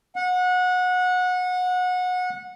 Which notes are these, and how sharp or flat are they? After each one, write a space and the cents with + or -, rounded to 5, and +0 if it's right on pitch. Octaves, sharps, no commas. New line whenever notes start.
F#5 -25